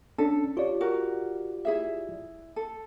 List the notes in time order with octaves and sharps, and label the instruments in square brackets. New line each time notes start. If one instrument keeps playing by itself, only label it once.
[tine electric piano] C#4 D4 [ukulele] A4
[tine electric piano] F4 G4 D5 [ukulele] C#5
[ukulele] F#4 A#4
E4 G#4 E5
A4